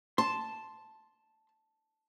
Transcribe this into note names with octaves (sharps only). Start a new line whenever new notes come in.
A5 C6